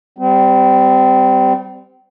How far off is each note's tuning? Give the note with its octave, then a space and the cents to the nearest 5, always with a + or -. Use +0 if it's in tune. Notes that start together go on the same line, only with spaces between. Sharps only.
G3 +0 C4 -30